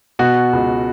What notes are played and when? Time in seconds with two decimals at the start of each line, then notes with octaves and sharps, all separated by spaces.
0.19 B2 F#4
0.53 C#2